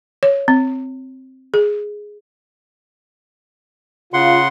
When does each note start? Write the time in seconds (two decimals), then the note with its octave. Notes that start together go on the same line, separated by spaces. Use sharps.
0.23 C#5
0.48 C4
1.54 G#4
4.14 C#3 F4 F#5 C6